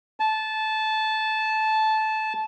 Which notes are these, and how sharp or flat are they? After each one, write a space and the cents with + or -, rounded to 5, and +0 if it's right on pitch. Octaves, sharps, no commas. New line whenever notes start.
A5 -15